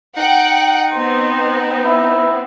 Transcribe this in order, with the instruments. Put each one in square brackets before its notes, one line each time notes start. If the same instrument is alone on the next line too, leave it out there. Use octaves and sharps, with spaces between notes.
[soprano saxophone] D#4 [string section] F#5 G5
[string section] B3 C4 [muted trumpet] C6
[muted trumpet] E4